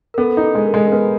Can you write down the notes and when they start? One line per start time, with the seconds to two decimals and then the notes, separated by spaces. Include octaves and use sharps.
0.14 A#4
0.18 B3 A4
0.37 D#4
0.43 A4
0.55 G#3
0.67 A#4
0.74 G#3
0.87 A#4
0.92 B3 B4